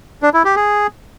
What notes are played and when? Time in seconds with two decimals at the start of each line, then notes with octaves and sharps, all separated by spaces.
0.23 D4
0.34 E4
0.45 G4
0.56 G#4